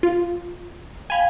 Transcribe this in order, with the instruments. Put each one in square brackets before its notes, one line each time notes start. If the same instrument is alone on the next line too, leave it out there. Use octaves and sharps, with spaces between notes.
[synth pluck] F4
[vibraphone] F5 G5 [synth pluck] G#5 B5